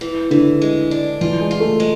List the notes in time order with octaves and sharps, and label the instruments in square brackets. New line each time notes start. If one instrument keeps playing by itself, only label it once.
[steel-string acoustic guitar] E3
[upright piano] D3 [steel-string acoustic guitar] E3
[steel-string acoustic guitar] G#3
D4
[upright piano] E3 [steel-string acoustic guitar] F4
[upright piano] G#3
[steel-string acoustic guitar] F4
[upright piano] A3
[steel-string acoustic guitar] G#3